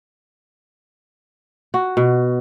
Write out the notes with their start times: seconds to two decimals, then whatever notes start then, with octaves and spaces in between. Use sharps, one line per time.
1.74 F#4
1.97 B2